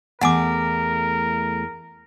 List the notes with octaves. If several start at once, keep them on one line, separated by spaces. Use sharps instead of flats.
E2 A3 A#4 F#5 G#5 D6